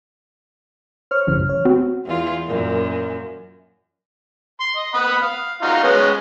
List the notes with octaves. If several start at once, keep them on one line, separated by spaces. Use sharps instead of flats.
C5 C#5 C#6 F6
A#1 F#2 C#3 E3
C#5
C4 F#4
E2 F4
F#2 A#2
C6
D#5
F#5 B5 D#6
F5
D#4 F4 F#4
G#3 B3 C#4